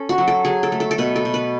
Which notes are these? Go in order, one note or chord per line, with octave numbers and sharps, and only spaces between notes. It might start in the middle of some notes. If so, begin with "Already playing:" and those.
Already playing: C#4 A4
F#4
F#3
A4
F#3 G#4
A4
A3
A4
A4
B2 B4
A4
B2
B4